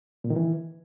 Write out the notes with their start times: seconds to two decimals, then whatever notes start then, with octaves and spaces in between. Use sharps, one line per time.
0.24 A#2
0.30 D#3
0.36 E3